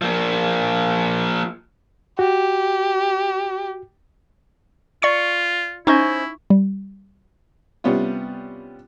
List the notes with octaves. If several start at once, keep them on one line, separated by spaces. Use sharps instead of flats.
F3 A#3
F#4 G4
F4 D5 C#6 C#7
C#4 D#4 E4 C5 D#5 C#6
G3
C3 G3 B3 C#4 F4